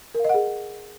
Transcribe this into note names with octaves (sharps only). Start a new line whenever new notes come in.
G#4 A#4 D#5 F5 F#5